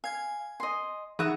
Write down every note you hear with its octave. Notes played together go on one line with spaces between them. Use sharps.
F5 G#5 G#6
D#5 C6
E3 D#4 G#4 E5 F#5 C#6